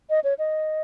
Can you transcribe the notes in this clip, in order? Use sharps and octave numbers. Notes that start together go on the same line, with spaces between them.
D#5
C#5
D#5